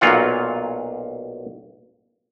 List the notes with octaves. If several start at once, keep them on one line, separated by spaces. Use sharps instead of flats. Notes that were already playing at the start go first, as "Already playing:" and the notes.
B1 A#2 F#3 F4 F#5